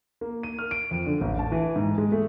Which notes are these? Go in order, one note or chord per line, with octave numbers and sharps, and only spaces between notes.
A#3
D#7
F6
D7
F2
D3
A1
A5
E3
G#2
G#3
A3